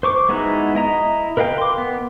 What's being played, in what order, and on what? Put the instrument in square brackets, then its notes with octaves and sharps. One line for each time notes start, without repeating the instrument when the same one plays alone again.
[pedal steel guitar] C5 C#6 D6
G#3 B3 D#4 E4 F#4
E4 D#5 A#5
A#4 B4 D#5 F5 G5
C6 D6
B3